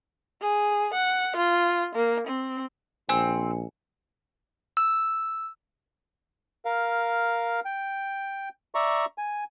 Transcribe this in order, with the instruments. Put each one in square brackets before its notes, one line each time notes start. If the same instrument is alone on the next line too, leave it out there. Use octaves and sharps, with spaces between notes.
[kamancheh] G#4
F#5
F4
A#3
C4
[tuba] A#1 [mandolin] C4 [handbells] G#5
[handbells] E6
[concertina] A#4 F5
G5
D5 E5 A#5 C#6
G#5